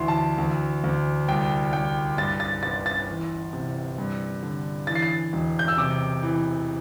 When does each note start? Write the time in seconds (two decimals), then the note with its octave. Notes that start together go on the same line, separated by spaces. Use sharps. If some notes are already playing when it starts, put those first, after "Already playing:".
Already playing: D2 E3 E5 C6
0.08 A5
0.38 D2
0.84 D2
1.28 C2 G5
1.73 C2 G5
2.18 G2 A6
2.40 A6
2.63 G1 A6
2.86 A6
3.08 E3
3.53 C3
3.98 G2
4.43 D3
4.87 E3 A6
4.95 C7
5.02 A6
5.33 E1
5.59 G6
5.68 E6
5.77 C3 D6
6.23 E3